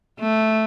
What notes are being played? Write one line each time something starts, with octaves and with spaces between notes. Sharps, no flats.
A3